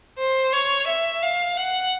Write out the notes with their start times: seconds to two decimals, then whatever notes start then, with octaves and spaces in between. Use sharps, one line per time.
0.18 C5
0.53 C#5
0.88 E5
1.22 F5
1.57 F#5